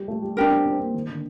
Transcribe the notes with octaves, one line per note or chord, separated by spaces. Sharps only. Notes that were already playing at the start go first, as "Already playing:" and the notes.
Already playing: G3
A3
G3
G3 D4 G4 A#4
C4
C4
A#3
D#3
D3